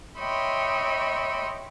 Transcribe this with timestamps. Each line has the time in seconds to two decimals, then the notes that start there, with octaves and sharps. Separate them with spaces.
0.18 C#5 D#5 E5 G5 B5 C6